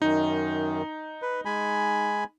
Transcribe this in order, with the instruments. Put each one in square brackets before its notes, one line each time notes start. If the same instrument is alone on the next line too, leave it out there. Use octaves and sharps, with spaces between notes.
[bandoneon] F#2 D#3 [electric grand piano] D#4
[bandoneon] B4
G#3 G#5 B5